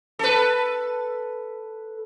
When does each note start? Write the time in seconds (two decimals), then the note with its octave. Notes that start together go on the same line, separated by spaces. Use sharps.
0.19 A4 B4